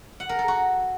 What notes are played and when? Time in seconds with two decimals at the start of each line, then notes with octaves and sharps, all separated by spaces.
0.20 F#5
0.29 A#4
0.39 A4
0.48 F#4